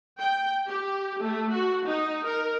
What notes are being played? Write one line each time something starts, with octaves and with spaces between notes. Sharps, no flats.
G5
G4
A3
F#4
D#4
A#4